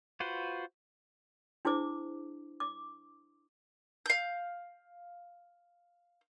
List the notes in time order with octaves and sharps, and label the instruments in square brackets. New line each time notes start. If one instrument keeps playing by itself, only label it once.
[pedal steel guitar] F4 F#4 B4 C5
[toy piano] D4 E4 G#4 C5 D6
D6
[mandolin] F5 G6